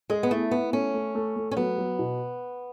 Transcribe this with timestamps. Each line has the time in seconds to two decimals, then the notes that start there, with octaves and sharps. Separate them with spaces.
0.10 G#3 G#4
0.23 B3
0.31 A3 E4
0.51 B3 E4
0.73 A3 C#4
0.94 A3
1.15 A3
1.36 A3
1.51 C#4
1.57 F#3 B3
1.78 F#3
1.99 B2